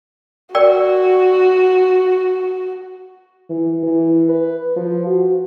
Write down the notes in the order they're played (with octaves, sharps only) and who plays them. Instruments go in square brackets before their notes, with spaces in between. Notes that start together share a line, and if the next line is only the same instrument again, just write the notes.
[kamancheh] F#4 [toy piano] A#4 D5 G5
[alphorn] E3
E3
B4
F3
F#4